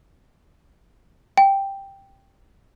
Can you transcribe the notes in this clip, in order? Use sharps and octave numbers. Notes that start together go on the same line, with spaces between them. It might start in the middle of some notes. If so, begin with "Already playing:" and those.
G5